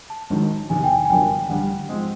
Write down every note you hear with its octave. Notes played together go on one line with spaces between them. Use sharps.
A5
G#1 G#2 D#3 F#3
E2 C3 D#3 G#5
G5
G#5
G#5
G1 F#2 D3 F#3 A#3 G5
G5
A1 G2 D3 G3 F#5
G#2 F3 G#3 C4